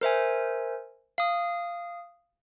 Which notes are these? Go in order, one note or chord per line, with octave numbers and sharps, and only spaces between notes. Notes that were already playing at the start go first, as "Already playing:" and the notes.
A#4 C5 E5 G#5
F5 D#6